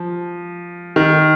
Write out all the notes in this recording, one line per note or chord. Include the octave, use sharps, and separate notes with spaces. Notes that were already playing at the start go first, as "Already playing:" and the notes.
Already playing: F3
D#3